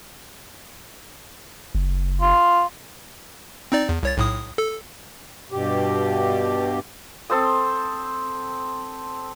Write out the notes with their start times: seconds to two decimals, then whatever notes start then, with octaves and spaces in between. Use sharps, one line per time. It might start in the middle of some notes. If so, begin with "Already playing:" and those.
1.75 F#1
2.21 F4
3.72 C4 D#4 D5
3.89 E2
4.03 C2 C#5 A6
4.17 B1 A2 D#6
4.58 A4
5.52 G2 B2 G4
7.30 C4 A4 C5 D#6